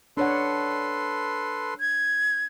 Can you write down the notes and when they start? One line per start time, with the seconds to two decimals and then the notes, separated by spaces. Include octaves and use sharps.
0.17 D4 A4 B4 C#5 F#5 C6
1.80 G#6